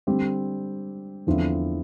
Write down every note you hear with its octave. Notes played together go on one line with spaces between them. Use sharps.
D3 G3 C4 G4
E2 D3 F3 C4 E4